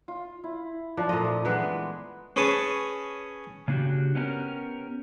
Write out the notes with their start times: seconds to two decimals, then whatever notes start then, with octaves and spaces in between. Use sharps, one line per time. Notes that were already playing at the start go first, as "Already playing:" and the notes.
0.08 F4
0.44 E4
0.97 F3 D4
1.09 A#2 A3 C5 D#5
1.45 E3 G#3 B3
2.36 C#4 G#4 B4 C#5 G#5 A5
3.68 C#3 A#3 D4 F#4 G4
4.15 B3 C#4 D4 G4 A#4